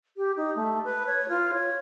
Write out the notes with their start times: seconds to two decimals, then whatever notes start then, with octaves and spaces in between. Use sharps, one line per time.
0.17 G4
0.37 D#4
0.55 A3
0.84 B4
1.06 C#5
1.29 F4
1.53 C#5